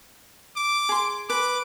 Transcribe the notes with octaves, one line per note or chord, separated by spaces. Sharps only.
D6
G#4 C6
B4 D6